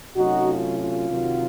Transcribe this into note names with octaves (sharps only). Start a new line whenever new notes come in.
C3 F#3 A3 C#4 D#4 F#4
F4
F4
C3 D#3 F#3